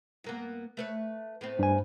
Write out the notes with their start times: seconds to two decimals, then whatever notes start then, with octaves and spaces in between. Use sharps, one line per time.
0.24 G2 A#3 B3
0.77 A3 B4 C#5
1.41 A2 B3 C4
1.59 G2 G#5